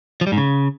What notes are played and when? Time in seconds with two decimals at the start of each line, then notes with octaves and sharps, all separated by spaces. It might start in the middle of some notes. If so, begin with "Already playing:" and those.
0.21 F3
0.27 G3
0.32 G#2
0.38 C#3